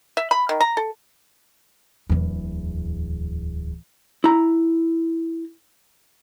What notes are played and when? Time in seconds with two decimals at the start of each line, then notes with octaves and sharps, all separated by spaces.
0.17 E5
0.31 B5
0.49 D#3
0.61 A#5
0.77 A4
2.09 D1 E2
4.24 E4 A#5